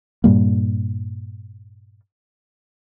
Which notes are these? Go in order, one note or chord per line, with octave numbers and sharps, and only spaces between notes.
G2 A#2 G3 A#3